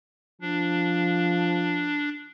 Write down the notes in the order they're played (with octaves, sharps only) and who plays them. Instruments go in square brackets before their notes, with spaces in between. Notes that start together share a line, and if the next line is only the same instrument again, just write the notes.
[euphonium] F3 [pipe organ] D4